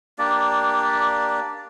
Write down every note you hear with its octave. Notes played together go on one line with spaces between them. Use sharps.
A#3 D4 G4 D5